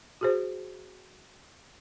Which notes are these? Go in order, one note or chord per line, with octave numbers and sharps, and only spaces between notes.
F#4 G#4 C5